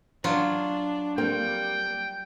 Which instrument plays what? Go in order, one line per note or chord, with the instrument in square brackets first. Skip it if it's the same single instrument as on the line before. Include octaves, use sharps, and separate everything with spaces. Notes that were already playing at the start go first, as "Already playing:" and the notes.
[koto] F#3 F4 [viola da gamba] D4
[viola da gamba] G3 [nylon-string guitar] A#3 C4 [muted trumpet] G5